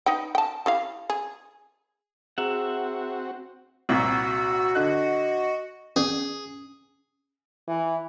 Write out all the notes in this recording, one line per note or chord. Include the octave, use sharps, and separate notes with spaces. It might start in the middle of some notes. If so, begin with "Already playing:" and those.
D#4 B4 G5
G5 A5
G3 E4 F5
G#4
C4 F#4 G#4 E5 F#5 A#5
C2 A#2 F#4 E6
D3 D#5 F#6
C#4 G#4
E3